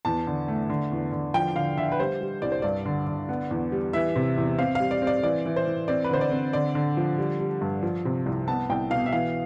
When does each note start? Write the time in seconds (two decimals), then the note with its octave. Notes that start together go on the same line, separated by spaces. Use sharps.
0.05 E2 A5
0.27 D3
0.48 A3
0.70 D3
0.92 E2
1.12 D3
1.34 F3 G5
1.56 D3 F5
1.77 D3 E5
1.92 B4
1.99 G3 C5
2.21 G3
2.42 C2 D5
2.52 C5
2.62 G2 D5
2.85 D3
3.07 D3
3.29 B3
3.51 E2
3.72 G3
3.93 E3 E5
4.16 C3
4.37 E2
4.58 C4 F5
4.75 G3 F5
4.91 D5
5.02 C4
5.07 D5
5.23 E3 D5
5.46 E3
5.56 C5
5.67 E3
5.88 C4 D5
6.04 B4
6.10 D3 C5
6.21 D5
6.31 C4
6.53 D3 D5
6.75 D3
6.97 F3
7.18 G3
7.40 G3
7.61 G2
7.83 F3
8.05 C3
8.26 C2
8.48 B3 A5
8.70 C2 G5
8.90 B2 F5
9.06 E5
9.13 E3 F5